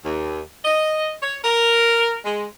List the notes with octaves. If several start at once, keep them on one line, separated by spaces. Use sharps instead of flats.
D#2
D#5
C#5
A#4
G#3